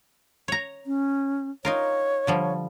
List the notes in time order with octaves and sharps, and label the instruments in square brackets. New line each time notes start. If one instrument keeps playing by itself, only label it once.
[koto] C#5 A#5
[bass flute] C#4
[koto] D#4 F4 A#4 [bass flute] C#5
[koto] D3 F3 G3